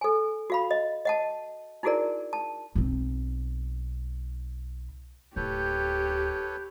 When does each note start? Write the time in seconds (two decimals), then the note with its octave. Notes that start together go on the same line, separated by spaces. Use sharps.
0.01 A4 G#5
0.50 F#4 F5 B5
0.71 D#5
1.05 D#5 F#5 A5
1.83 D#4 E4 F#4 G#4 A#4 D5
2.33 A5
2.75 B1 C4
5.36 D1 G4 A4 B4 C#5 G6